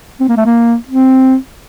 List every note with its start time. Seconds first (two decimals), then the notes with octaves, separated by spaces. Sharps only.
0.20 C4
0.29 A#3
0.37 A3
0.46 A#3
0.88 C4